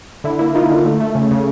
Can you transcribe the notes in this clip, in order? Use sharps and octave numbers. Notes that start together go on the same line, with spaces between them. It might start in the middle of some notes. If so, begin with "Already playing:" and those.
D3 E4
A#3 E4
A#3 D#4 F4
D3
A3
A3
C#3
C#3